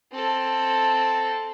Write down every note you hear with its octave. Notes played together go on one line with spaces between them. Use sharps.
C4 A4